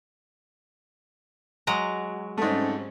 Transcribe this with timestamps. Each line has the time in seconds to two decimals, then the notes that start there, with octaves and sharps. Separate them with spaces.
1.67 F#3 G#3 A#5
2.38 G#2 G3 A3 C4 C#4